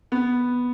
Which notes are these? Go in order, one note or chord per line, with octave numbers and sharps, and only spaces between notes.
B3